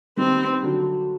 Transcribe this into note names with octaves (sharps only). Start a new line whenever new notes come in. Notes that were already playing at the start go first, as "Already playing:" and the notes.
D#3 G3 C4
D3 F#3